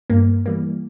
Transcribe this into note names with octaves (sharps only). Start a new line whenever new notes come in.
G2 A#3
E3 G3 A#3